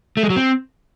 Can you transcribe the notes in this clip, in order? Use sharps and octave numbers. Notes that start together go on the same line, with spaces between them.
A3
G#3
F#3
C4